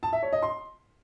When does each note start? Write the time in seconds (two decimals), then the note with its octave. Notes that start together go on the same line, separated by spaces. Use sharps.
0.03 A5
0.13 E5
0.23 C#5
0.33 D#5
0.42 C6